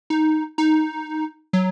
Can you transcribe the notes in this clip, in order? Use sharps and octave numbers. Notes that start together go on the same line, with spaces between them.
D#4
D#4
F#3